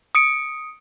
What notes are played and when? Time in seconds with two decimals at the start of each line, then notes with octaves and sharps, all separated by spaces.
0.15 D#6 C#7 D7